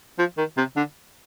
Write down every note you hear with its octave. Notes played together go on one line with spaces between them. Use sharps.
F3
D#3
C3
D3